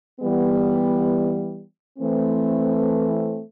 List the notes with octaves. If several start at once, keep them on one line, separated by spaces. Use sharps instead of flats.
E3 G3 B3
E3 A3 C4